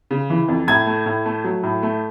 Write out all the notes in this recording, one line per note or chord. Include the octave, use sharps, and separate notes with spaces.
C#3
E3
F2
A2 G#6
A3
A2
A3
F#3
A2
A3